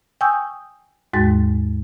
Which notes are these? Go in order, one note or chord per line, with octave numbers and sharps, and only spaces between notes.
G5 G#5 C#6 D#6 E6 G6
D#2 G#2 G#3 F#4 A6